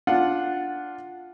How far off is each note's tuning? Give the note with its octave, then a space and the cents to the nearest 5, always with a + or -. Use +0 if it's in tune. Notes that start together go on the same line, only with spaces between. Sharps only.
D4 +0 F4 +5 F#5 +0